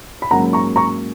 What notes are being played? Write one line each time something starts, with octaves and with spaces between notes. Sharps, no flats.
B5
G#2 F#3 A#3 C#4 F#5 A#5
A#5 C#6
A#5 C#6